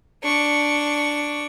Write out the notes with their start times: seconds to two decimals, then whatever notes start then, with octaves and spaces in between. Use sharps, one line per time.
0.24 D4 C#6